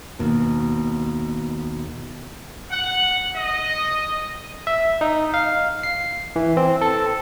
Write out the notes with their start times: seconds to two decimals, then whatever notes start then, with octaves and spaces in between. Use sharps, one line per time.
0.19 D#2 B2
2.71 F#5
3.35 D#5
4.67 E5
5.01 D#4
5.34 F5
5.83 C7
6.36 E3
6.57 C4
6.81 A4